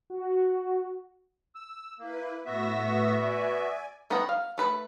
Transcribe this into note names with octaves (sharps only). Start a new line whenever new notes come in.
F#4
E6
A#3 E4 B4
A2 B3 F#4 E5 E6 A#6
D5 G#5
D#3 B3 D#5 F#5 A#5
F5
A3 B4 B5